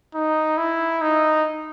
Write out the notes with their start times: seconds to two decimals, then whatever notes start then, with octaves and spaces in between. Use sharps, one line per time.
0.15 D#4
0.57 E4
1.01 D#4